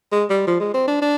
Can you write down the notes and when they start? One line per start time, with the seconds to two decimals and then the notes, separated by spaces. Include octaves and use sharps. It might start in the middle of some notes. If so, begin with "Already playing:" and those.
0.12 G#3
0.30 G3
0.47 F3
0.60 G#3
0.74 C4
0.87 D4
1.02 D4